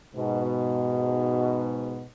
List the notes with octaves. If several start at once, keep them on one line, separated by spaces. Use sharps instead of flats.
G#2 B2